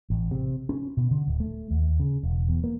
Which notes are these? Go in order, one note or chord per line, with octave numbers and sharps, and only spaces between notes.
A1
C3
C#4
B2
D3
D1
A3
D#2
C#3
E1
E2
A#3